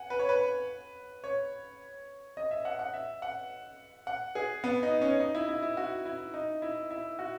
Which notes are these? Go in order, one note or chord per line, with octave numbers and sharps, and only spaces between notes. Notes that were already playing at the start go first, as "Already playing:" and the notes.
Already playing: F#5 G#5
B4
C#5
B4
C#5
D#5
E5
F#5
F#5
E5
F#5
F#5
G#4
B3
D#4
C#4
D#4
E4
E4
E4
F#4
E4
D#4
E4
E4
F#4